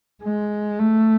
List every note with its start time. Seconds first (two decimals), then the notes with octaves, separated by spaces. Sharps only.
0.23 G#3
0.79 A3